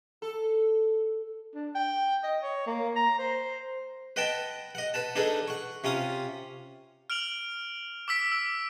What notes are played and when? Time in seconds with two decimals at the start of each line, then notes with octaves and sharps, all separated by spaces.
0.22 A4
1.55 D4
1.75 G5
2.23 D#5
2.42 C#5
2.66 A#3
2.96 A#5
3.19 C5
4.16 B4 D#5 F#5 G5 A5 B5
4.75 D#5 F#5
4.94 B4 F#5 A5
5.16 D4 D#4 G#4 A4 B4
5.48 F#5 C#6
5.84 C3 C#4 F4 D#6
7.10 F6 D7 F7 F#7
8.08 D6 E6 B6 D7
8.32 E6